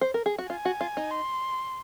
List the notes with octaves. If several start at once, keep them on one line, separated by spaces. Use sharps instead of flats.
C5
A#4
G#4
F#4
F4 G#5
F#4
F4
D#4
C6